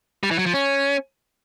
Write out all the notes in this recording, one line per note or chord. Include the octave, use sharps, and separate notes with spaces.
G3
E3
F#3
F3
C#4